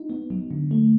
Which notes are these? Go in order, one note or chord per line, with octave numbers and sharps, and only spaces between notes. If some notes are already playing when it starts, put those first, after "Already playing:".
Already playing: D#4
B3
F#3
D3
A3